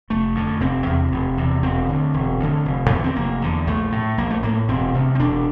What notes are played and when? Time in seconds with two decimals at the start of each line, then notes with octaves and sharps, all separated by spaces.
0.10 F1 A3
0.35 F2 D3
0.60 F1 C4
0.86 E2 C3
1.12 F1
1.37 E2 C3
1.63 E1 C4
1.89 D2 D3
2.14 E1
2.40 D2 D3
2.65 F1
2.90 E2 D3
3.04 C4
3.16 F1 A#3
3.42 E2 D3
3.67 A#1 A3
3.92 A2
4.18 A#1 A#3
4.30 A3
4.43 A2 A#3
4.69 E1 C4
4.94 D2 C3
5.15 C4
5.19 E1 D4